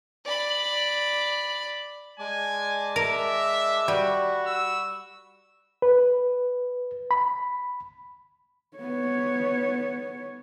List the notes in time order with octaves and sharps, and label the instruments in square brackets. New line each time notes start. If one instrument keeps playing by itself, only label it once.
[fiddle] D5 B5
[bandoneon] G#3 [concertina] D5 A5 D6 [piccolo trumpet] G#5
[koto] A#4 [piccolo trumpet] E5
[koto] G3 [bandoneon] F#4 [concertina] F#5 B5 C#6
[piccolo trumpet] E6
[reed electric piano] B4
B5
[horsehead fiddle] B3 C#5